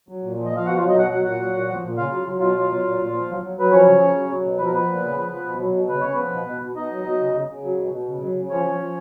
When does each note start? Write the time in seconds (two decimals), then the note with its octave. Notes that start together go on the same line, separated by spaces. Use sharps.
0.09 F#3
0.23 A#2
0.37 F3
0.46 D#5
0.52 F3 F5
0.66 B2 F#4 F#5
0.77 F4 F5
0.81 F#3
0.88 D#4 D#5
0.95 B2 F#4 F#5
1.10 F#3 F#5
1.24 A#2 F#4 F#5
1.39 F#3
1.54 A#2
1.69 F3
1.82 A#2
1.97 C#3 F4 F5
2.11 F#3
2.26 F#3
2.40 B2 F4 F5
2.55 F#3
2.70 F#3
2.84 A#2
2.98 A#2
3.13 F3
3.28 F#3
3.42 F#3
3.57 F#3 B4
3.71 F3 C#4 C#5
3.85 C#3
4.00 C#3
4.15 F#3
4.29 F#3
4.44 B2
4.58 F3 B4
4.65 A#4
4.72 F3 B3 B4
4.87 A#2
5.02 C#3
5.16 F3
5.31 F3
5.46 B2
5.60 F#3
5.75 B2
5.89 C#3 B4
6.01 C#3 C#5
6.14 F3 B3 B4
6.32 B2
6.47 B2
6.62 B2
6.76 B2 D#4 D#5
6.91 F#3
7.05 F#3
7.20 C#3
7.34 C#3
7.49 C#3
7.64 F#3
7.78 B2
7.92 B2
8.07 C#3
8.21 F#3
8.35 C#3
8.50 F3 C#4 C#5
8.64 F3
8.79 F3